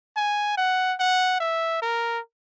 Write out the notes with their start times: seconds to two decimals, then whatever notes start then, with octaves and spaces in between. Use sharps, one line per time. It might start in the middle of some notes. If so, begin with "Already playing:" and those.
0.16 G#5
0.57 F#5
0.99 F#5
1.40 E5
1.82 A#4